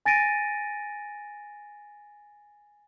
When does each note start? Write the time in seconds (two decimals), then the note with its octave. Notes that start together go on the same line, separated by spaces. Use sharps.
0.06 G#5 A6 A#6 D7 D#7